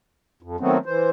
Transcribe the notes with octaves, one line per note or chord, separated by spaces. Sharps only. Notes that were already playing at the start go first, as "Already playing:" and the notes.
F2
D#3 F#3 A3 B3 C4
E3 C5